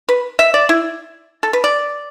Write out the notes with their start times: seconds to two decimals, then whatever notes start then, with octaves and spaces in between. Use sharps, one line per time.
0.09 B4
0.39 E5
0.54 D5
0.69 E4
1.43 A4
1.53 B4
1.64 D5